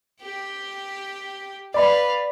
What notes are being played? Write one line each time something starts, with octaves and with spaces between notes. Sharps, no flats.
G4 G5
B4 D5 F5 B5